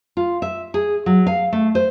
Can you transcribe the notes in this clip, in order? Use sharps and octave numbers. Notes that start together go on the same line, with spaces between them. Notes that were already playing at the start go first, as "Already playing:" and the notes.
F4
E5
G#4
F#3
F5
A3
C5